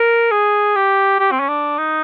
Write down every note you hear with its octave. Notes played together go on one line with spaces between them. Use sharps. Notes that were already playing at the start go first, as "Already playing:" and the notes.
Already playing: A#4
G#4
G4
G4
C4
C#4
D4
D#4